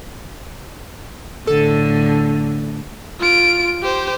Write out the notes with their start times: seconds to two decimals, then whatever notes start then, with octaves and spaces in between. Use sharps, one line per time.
1.47 A2 D3 A4
3.20 F4 D7
3.83 G4 C5